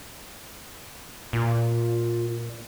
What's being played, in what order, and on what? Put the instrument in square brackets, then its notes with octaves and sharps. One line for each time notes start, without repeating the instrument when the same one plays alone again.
[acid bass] A#2 [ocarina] F4